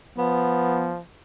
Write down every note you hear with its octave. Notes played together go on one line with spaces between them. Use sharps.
F3 B3